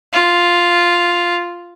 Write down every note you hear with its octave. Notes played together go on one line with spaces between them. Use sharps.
F4